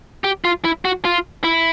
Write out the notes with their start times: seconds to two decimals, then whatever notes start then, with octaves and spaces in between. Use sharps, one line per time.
0.24 G4
0.44 F4
0.64 E4
0.85 F#4
1.05 F4
1.44 E4